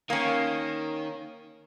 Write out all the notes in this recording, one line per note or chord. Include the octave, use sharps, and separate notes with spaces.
D#3 A#3 C#4